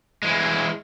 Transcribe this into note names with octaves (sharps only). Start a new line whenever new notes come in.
E3 G#3